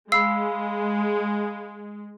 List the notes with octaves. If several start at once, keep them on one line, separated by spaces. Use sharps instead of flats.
G#3 F5 B5 E6 C7